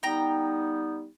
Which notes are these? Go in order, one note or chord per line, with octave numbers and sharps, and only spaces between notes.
G3 B3 D#4 G5 A#5